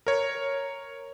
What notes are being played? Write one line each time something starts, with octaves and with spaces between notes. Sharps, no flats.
A#4 C#5